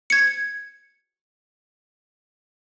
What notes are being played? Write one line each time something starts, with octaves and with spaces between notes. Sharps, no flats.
G#6 C#7